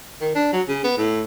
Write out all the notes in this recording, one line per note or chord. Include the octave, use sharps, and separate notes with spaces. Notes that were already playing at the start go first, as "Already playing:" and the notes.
D#3
D4
F#3
C#3
B3
A2